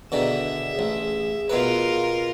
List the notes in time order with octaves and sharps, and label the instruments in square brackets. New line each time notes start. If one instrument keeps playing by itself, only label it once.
[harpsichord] B2 D3 D#3 [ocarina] G#4 [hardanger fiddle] E5
[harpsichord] A1
[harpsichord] B2 B4 [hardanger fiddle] F4 A#4